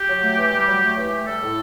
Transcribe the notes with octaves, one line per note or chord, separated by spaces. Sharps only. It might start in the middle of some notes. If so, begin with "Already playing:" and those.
Already playing: G4
F#3
A3
E3
G3
F#3
A3
E3 G4
A3
G3 A4
A2